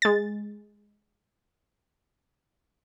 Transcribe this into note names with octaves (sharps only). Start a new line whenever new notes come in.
G#3 A6